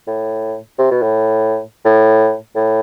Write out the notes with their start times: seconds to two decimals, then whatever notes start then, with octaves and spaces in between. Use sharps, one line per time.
0.07 A2
0.78 C3
0.91 B2
1.03 A2
1.85 A2
2.56 A2